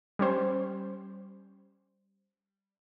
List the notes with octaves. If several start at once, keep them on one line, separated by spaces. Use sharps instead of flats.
G3 C#4 C5